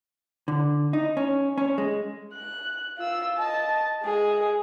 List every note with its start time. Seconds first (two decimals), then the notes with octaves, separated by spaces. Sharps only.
0.48 D3
0.93 D#4
1.17 C#4
1.58 C#4
1.78 G#3
2.34 F#6
2.99 F4 E6
3.37 D#5 A5
4.03 G#3 G#4